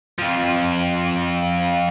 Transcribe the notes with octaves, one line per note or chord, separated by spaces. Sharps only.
F2 F3